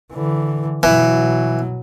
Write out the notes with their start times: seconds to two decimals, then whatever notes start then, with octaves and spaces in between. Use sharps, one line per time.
0.12 D3 E3
0.83 B2 E3 F#3